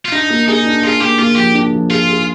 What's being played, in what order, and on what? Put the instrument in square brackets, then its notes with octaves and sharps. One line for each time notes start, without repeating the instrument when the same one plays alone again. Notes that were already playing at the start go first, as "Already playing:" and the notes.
[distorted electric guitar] F4
[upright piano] D4 [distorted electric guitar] D#4
[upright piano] A#3
[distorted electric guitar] D#4 [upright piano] G#4
[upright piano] D4
[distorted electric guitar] F4 [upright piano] G#4
[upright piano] A#3 [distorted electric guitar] G4
[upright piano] A#3 [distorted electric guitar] F4
[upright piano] F3 [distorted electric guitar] G4
[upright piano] D4
F3
[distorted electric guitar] F4 [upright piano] G#4
[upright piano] G#4